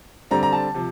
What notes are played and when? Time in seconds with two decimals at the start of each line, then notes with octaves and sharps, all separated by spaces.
0.31 D3 G3 C4 A#5
0.43 A#5
0.53 A5
0.74 C3 F3